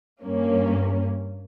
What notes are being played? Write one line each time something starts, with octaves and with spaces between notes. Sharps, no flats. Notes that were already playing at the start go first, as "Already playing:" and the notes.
G2 A#3 C#4